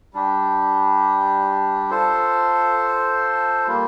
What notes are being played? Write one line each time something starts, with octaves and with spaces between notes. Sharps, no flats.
G3 D4 G4
F4 A4 C5
G3 A#3 F4